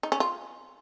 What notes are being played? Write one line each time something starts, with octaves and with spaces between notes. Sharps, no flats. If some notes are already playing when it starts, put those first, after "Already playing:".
D#4
C#4
F4